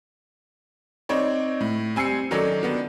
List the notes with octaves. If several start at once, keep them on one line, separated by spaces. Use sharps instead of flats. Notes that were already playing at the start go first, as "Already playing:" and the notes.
C4 D#4 C#5 D5
A2
G3 C4 G#5 E6 C7 C#7
D#3 F#3 C#4 A4 D5
D#3 B3 D4